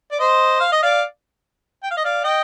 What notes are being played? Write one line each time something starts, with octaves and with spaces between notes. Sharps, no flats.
D5
C5 D#5
F5
D#5
D5 F5
G5
F5
D#5
D5 F5
D#5 G5